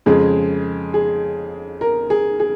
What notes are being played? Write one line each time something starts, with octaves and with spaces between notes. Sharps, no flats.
F2 C#3 G#3 G#4
G#4
A#4
G#4
G#4